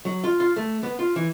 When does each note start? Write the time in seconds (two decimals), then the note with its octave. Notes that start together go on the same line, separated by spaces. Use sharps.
0.05 F#3
0.24 F4
0.40 F4
0.56 A3
0.83 B3
0.99 F4
1.16 E3